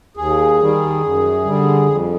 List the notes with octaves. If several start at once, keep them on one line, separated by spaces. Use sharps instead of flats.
D#2 G#4
D#3 G3
F#2
D3 G3
F2